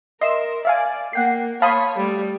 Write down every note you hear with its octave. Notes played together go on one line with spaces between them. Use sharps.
A#4 D#5 E5 C6 E7
D5 E5 F5 G#5
A#3 F#5 G5 C7
C#5 F5 A5 B5 C6 D#6
G3 A3